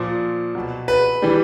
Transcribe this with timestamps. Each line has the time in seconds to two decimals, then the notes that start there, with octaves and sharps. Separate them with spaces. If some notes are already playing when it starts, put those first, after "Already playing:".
Already playing: A#2 F3 C5
0.55 B2 F#3
0.88 B4
1.22 E3 G3